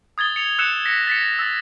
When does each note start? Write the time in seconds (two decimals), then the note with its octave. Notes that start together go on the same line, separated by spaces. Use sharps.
0.18 D#6 G#6 A6 G7
0.36 C#7 F7
0.58 E6 F#6 G6 C#7 E7
0.85 A#6 B6 C#7
1.07 A6 B6 C#7
1.39 E6 A6